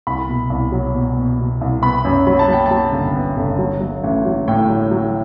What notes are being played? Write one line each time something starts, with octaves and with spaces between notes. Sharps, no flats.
C2 B5
B2
C2
F#3
B2
B2
B2
C2
B3 B5
F#2
F#3 B5
A5
F#3 G5
A5
F#3
G1
B3
G1
F#3
F#3
A1
F#3
A2 G5
F#3
F#3